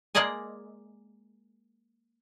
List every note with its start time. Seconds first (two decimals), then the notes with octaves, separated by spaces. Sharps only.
0.15 G#3 A#3 A#4 D5 D#5 G#5